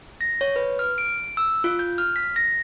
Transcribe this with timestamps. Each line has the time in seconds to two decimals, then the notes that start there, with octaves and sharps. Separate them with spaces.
0.21 A#6
0.41 C#5
0.56 B4
0.79 F6
0.98 D7
1.37 E6
1.64 F4
1.79 G6
1.98 F6
2.16 B6
2.36 A#6